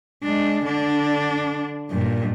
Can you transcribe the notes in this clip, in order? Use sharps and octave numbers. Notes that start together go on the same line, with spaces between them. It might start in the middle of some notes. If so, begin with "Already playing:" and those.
G#3 D4
D3 D4
G2 A#2